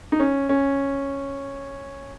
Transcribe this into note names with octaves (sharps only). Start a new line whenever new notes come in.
D#4
C#4
C#4